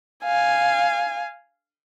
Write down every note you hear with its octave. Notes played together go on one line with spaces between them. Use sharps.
F5 G#5